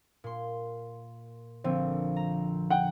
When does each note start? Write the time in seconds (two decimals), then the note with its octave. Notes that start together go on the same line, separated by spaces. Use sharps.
0.24 A#2 C6
1.64 A#1 D3 F3 C4
2.16 A#5
2.70 F#5 G5